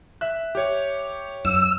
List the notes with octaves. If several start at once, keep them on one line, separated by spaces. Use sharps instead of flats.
E5 F#6
G4 C#5
F#2 E6